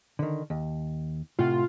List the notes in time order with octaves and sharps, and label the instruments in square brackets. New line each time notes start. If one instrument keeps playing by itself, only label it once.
[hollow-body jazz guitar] D3 D#3
D#2
[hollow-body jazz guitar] A2 C3 F#5 [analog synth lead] F4